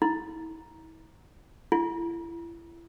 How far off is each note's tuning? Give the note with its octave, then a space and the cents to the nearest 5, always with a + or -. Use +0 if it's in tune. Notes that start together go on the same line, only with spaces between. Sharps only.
E4 -40
E4 +30